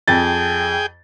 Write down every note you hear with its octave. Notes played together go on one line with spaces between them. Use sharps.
F2 G#4 G5 A6